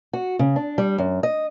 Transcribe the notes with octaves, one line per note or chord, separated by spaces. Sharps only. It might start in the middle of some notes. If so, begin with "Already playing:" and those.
F#4
C#3
D4
G3
F#2
D#5